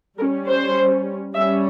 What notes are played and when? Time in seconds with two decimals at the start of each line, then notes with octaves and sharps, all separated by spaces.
0.18 G3 A#4
0.22 C#4
0.47 C5
1.34 G3 C#4 E5